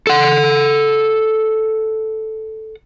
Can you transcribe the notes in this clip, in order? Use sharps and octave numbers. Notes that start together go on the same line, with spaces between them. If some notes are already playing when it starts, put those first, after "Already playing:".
A4 F#5